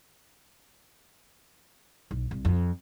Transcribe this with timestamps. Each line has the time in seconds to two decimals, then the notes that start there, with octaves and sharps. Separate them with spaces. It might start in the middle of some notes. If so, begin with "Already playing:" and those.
2.11 B1
2.31 C2
2.45 F2